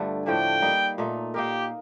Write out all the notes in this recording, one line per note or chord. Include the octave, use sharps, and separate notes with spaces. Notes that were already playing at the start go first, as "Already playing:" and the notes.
Already playing: G2 D3 A3 F4
A2 F3 A3 D4 G5
G3 A#3 D#4
A#2 A3 D#4
A#3 D#4 G4 A#4